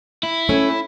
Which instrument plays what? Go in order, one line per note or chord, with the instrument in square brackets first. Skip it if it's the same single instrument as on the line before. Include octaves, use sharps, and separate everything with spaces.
[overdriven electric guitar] E4
[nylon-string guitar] A3 C#4